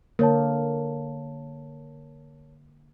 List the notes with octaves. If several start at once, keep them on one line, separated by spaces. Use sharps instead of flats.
D3 A#3 A#4 C#5 A5